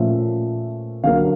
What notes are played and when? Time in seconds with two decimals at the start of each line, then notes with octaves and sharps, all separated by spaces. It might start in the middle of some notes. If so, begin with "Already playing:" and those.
Already playing: A#2 F3 A3 C#4 F4 E5
1.03 D3 F#3 A#3 F5